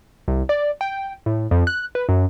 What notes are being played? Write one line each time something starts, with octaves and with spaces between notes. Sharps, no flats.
C2
D5
G5
A2
F2
F#6
B4
F#2